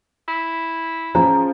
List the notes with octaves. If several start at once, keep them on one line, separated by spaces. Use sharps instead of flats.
E4
F3 C#4 G#4 A#5